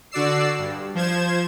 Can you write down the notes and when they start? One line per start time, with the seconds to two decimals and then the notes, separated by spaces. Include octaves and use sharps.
0.11 D3 F#4 D5 E6 C7
0.58 G2
0.95 F3 C5 G#6 E7